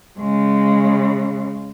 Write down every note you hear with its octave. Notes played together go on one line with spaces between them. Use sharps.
C#3 G#3